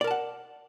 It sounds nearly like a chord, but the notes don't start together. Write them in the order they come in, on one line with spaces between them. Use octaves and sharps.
D5 A#4 A5 F#5